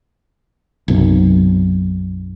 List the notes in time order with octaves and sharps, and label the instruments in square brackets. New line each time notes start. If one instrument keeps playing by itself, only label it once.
[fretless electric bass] B1 F#2 C3